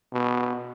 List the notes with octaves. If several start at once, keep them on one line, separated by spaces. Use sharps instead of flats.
B2